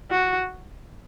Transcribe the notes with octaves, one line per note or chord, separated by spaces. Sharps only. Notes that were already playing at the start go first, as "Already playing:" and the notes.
F#4